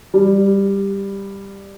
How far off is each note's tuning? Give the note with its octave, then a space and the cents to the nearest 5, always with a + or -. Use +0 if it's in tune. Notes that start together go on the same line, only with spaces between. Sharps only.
G3 +10